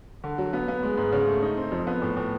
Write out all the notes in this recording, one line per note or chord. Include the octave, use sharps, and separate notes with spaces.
D3
F#3
B3
B3
G#3
G#2
C#3
A3
D#4
C4
F2
B3
A2
A2